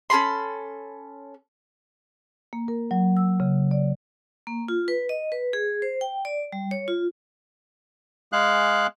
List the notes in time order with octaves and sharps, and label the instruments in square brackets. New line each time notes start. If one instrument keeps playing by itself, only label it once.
[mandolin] C#4 A4 B5 C6
[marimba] A#3
A#4
F#3
E6
C#3
D5
[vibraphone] A#3
F4
B4
D#5
B4
G#4
C5
G5
D5
G3
C#5
F4
[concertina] G#3 G#4 F5 F#6